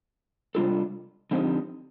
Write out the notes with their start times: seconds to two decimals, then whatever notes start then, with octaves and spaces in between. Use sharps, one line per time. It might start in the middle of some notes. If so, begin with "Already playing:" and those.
0.55 C3 G3 D4 F4 A4
1.31 D3 F3 C4 D#4 G4